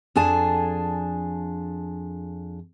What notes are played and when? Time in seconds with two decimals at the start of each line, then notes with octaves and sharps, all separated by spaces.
0.15 F2 D4 G#4 G#5 A5